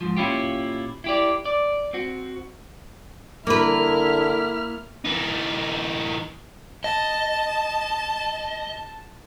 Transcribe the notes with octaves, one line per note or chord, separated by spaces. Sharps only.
G#2 F3
A#2 C#4 E4 F4 G4
E4 G4 D5
D5
C4 F#4
D3 A#3 E4 B4 F6
E3 D#4
D#5 A5